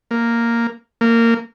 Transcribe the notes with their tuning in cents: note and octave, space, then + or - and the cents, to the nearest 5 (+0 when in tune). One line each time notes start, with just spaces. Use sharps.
A#3 -5
A#3 -20